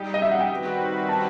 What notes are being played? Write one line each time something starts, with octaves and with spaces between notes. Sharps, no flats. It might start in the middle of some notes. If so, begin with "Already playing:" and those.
Already playing: G3 D#4 G4
D#5
E5
F#5
G5
D#3 G3 C4 F#4 B4
A5